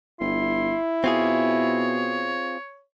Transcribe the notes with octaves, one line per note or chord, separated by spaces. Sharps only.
G1 E4 C6
B2 C4 F4 G#4 C#5